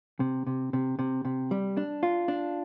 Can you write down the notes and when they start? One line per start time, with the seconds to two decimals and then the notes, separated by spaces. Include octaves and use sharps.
0.20 C3
0.47 C3
0.73 C3
0.99 C3
1.25 C3
1.51 G3
1.77 D4
2.03 F4
2.28 D4